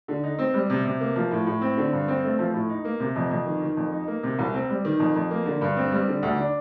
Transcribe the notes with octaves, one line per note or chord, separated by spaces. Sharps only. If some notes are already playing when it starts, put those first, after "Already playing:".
D3
D#4
C4
G3
C3
C3
A#3
F3
A2
A2
C4
D3
G2
C4
A3
F3
A2
D#4
A#3
C3
F2
F2
D#3
D#3
F2
D#4
A#3
C3
C2
C4
G3
D#3
F2
F2
A#3
D3
G2
C4
G3
D3
D2
D4